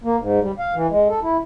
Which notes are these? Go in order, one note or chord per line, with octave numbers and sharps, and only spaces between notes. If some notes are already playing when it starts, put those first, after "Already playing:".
A#3
G#2
G3
F5
E3
G#3
A4
E4